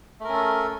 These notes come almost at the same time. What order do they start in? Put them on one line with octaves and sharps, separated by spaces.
A3 A#4 C#4 A4